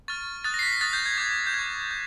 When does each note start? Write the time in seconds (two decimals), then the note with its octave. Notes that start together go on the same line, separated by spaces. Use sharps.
0.08 C#6 F6 A6
0.44 D#6 F#6 A6
0.54 A#6
0.59 C7
0.63 B6
0.72 A#6
0.81 D#6 F#6 A6
0.93 G6
1.06 G#6
1.17 D6 G6 G#6
1.47 G6
1.54 C#6 F#6 G#6
1.91 G6